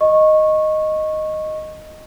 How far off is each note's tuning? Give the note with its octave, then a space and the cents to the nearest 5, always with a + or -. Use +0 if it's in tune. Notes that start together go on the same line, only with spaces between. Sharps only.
D#5 +0 C#6 -20